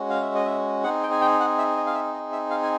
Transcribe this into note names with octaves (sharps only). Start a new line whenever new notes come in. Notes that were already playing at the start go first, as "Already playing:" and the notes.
Already playing: G#3 C#4 F#4
F5
E5
D#5
E5
C4 D#4 G#4 F#5
G5
G#5
G5
F#5
E5
D#5
F5
E5
D#5
E5
F5
G#5